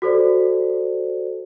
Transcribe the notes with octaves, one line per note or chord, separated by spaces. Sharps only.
F#4 A4 C5 D5